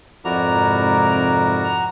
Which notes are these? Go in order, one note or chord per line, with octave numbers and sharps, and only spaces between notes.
F2 G#2 C3 E4 F#4 A#4 D5 A#5